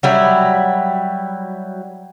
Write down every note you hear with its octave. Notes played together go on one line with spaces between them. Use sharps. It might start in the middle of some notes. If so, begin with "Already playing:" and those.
F#3 G3 E4